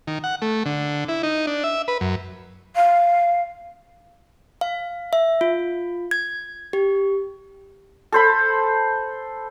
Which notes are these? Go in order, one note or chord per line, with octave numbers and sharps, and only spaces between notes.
D#3
F#5
A3
D3
E4
D#4
D4
E5
B4
F#2
F5
F5
E5
F4
G#6
G4
A4 C5 B5